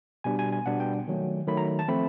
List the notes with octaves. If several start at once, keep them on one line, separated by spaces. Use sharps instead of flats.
B2 G3 B3 D4 G#5
G#5
G#5
B2 G3 B3 D4 F#5
G5
D#3 F#3 A3
D#3 F#3 A3 B5
A#5
A5
F3 A3 C4 B5